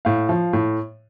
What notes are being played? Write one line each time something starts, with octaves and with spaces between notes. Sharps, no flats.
A2 F5
F3
A2